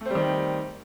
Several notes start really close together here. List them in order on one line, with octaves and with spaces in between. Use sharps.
A3 C4 G3 D#3